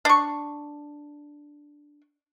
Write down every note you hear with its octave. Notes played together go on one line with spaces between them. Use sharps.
D4 C#6